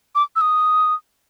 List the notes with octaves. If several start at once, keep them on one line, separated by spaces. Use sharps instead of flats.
D6
E6
D#6